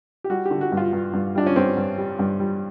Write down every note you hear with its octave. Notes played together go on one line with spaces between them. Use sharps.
G4
G3 F#4
G4
D3
F#4
G2
F4
G2
G2
G3 D4
C#4
G2 C4
G2
G3
G2
G3